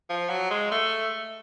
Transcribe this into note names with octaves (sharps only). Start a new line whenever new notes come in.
F3
F#3
G#3
A3